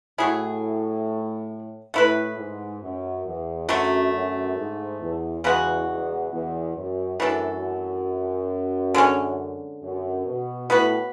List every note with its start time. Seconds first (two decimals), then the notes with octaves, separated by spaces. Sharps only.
0.18 A2 F#3 A3 E4 G#4
1.94 A2 A3 E4 B4
2.37 G#2
2.81 F#2
3.25 E2
3.68 F#2 D3 F#3 A3
4.13 F#2
4.56 G#2
5.00 E2
5.43 E2 C#3 G#3 B3 F#4
5.87 E2
6.31 E2
6.75 F#2
7.20 F#2 E3 A3 D4 A4
8.94 D3 G#3 C#4
9.82 F#2
10.25 B2
10.69 A2 B3 F#4 B4